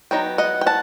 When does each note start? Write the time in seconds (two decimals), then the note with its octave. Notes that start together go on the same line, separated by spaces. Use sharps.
0.11 F#3 B3 D#4 G5
0.38 D#5 F#5
0.61 G5
0.66 F#5 A5